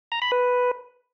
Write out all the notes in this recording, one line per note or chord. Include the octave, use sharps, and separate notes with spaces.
A#5
B5
B4